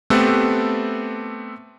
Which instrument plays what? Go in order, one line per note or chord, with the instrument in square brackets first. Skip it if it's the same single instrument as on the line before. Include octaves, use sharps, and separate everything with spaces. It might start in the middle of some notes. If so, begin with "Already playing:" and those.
[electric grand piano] A3 B3 C4 G4 A4 B4